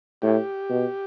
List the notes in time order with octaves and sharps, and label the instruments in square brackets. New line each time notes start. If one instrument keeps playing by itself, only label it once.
[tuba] A2 [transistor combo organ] G4
[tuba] B2